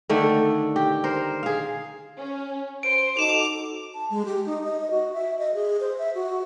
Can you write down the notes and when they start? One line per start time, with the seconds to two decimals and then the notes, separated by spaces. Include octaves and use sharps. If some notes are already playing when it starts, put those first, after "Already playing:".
0.09 D3 D#3 A3 D4
0.76 G4
1.04 A#4 C5
1.43 G#4 F5
2.18 C#4
2.83 C5 D7
3.17 D#4 F#4 A4 D6 E7 F7
3.94 A5
4.10 G#3
4.25 G4
4.46 D#4
4.64 D#5
4.91 F#4
5.13 E5
5.39 D#5
5.54 G#4
5.80 C5
5.98 E5
6.15 F#4